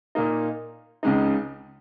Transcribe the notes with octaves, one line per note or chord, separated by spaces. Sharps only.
A#2 A#3 D#4
C#2 C#3 G#3 D#4